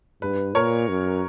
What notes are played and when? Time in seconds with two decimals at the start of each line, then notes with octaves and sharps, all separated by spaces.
0.22 G2 B4
0.55 A#2 A#4 C#5
0.88 F#2